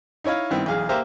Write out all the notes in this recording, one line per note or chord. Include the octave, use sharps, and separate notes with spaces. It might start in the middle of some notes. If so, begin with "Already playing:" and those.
D#4 E4 C#5 D#5 F5
G2 D#3 B3 C4 E4
B1 E2 G#4 F5 F6
A#3 G4 C5 E5 F5 A#5